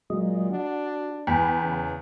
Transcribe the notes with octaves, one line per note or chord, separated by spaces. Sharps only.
A#2 F#3 G#3 D#5
D4 F#4
E2 G5 B5
C#3